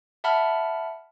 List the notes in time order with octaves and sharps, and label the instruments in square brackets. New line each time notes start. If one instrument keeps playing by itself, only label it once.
[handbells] E5 F#5 A5 B5 F6